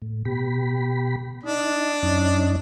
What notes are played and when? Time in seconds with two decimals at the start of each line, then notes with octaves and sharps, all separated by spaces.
0.02 A2
0.25 B2 G4 B5
1.43 D4 D#4
2.03 F#2 C#4 D#4